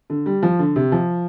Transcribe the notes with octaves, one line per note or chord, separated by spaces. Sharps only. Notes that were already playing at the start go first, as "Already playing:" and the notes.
D3
G3
F3
D3
C3
F3